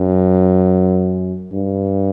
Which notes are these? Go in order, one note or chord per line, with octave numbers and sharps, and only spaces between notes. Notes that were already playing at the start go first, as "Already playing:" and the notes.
Already playing: F#2
G2